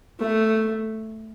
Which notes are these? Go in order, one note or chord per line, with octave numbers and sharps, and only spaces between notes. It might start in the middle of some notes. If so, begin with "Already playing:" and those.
A3